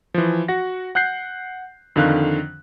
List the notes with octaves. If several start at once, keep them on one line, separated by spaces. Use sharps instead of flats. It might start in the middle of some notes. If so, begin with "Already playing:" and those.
E3 F3
F#4 F#5 A#6
F#5 F#6 G6 C7
F2 D3 D#3 F5 F#6